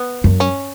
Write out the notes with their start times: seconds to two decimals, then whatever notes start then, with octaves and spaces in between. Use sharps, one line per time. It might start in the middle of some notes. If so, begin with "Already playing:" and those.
Already playing: B3
0.24 F#2
0.40 C#4